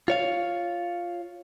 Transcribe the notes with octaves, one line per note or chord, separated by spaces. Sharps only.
F4 C#5 F5